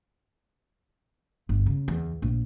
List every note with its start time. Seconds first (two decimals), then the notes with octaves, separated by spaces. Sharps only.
1.49 G1
1.66 C#3
1.88 E2
2.22 A#1